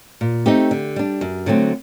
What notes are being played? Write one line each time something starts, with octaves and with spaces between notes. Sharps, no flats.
A#2
A3 C4 D#4 G4
D3
G3 D4
F#2
D3 F#3 A3 C4